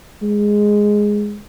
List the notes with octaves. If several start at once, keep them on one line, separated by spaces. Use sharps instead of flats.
G#3